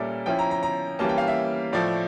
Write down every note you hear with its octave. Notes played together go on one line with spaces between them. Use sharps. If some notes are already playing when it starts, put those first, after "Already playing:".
Already playing: A#2 G3 C#4 A4 A#4 D5 E5
F3 C#4 E4 G5
A#5
A#5
A#5
E3 G3 A#3 C#4 A5
G5
F5
E5
A2 F3 A3 D5